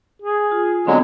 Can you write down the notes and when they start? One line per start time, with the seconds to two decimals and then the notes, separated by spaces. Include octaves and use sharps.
0.22 G#4
0.51 F4
0.87 D3 F#3 G#3 B3 C4